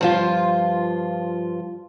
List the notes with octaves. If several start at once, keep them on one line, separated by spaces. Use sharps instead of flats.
G2 F3 F4